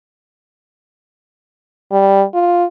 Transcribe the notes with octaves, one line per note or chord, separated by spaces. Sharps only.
G3
F4